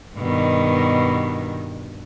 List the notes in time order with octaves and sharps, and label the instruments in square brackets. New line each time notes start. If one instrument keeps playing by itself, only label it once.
[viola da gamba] G2 B2 D#3